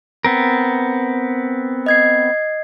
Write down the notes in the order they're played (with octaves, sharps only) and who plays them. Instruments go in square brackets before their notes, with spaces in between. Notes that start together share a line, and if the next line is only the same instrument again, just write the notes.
[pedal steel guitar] B3 C4 A#4
[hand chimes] D#5 G#6 C7